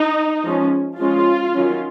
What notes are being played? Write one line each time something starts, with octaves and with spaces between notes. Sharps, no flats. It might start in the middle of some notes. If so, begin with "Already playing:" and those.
Already playing: D#4
F3 G#3 C#4
F3 G#3 C#4 F4
D#3 F#3 C#4